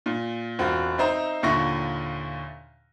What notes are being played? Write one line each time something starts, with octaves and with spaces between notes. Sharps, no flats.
A#2
E1 C4 F4 F#4
C4 D#4 C5 E5 A#5
D#2 A#2 D3 E4 C#6 A#6